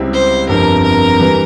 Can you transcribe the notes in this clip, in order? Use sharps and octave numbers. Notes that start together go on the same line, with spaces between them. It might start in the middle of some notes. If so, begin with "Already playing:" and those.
Already playing: C#2 C3 G3 C4 E4
C5
G1 F2 C3 A#4
A#4
E3 G3